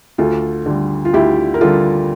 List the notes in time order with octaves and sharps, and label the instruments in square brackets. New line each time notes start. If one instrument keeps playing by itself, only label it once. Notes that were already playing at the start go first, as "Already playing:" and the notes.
[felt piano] D2 F4 A4
D3 G3
F4
D2 E4 G4
A#4
D3 G3 F4 A4